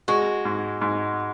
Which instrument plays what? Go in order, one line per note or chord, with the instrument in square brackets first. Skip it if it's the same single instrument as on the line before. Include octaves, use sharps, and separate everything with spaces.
[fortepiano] G#3 [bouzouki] F#4
[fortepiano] G#2
G#2